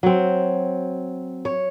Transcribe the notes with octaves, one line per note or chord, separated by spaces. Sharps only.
F#3 C4
C#5